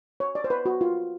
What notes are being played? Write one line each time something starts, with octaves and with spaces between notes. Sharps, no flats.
C#5
D5
C5
B4
F#4
F4